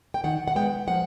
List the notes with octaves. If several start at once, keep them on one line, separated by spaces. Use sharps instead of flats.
G5
D#3 F#5
F#5
G#3 B3 G5
F3 F#5